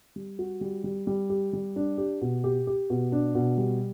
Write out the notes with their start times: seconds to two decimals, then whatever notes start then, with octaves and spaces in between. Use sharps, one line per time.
0.16 G3
0.39 F#4
0.61 G3
0.84 G3
1.07 G3
1.30 G4
1.53 G3
1.76 D4
1.98 G4
2.21 B2
2.44 G4
2.67 G4
2.90 B2
3.12 D4
3.35 B2
3.58 G3